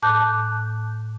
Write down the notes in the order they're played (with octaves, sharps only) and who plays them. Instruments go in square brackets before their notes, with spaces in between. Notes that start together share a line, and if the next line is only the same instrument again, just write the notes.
[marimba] A2 A5 D6 F#6 G6